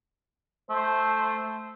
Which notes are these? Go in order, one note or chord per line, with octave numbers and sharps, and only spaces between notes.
A3 C5